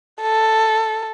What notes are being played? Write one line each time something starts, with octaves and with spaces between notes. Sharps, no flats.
A4